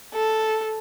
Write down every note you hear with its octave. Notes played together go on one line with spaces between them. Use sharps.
A4